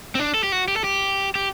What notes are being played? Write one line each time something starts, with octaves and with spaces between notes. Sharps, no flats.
C4
D4
A4
G4
F#4
G4
A4
G4
G4